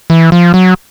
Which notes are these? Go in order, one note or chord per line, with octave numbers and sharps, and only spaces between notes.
E3
F3
F#3